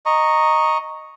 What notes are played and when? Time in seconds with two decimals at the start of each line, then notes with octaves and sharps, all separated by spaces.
0.06 D#5 A#5 C#6